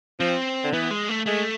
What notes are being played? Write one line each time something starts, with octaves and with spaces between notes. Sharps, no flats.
F3 C4
D3
E3 B3
G#3
A3
G#3 A3